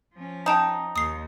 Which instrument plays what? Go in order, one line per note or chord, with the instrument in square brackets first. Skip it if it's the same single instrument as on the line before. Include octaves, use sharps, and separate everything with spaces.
[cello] F3 C#4
[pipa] D#4 [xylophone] G5 A5 A#5
[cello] D#2 [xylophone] D#6 C7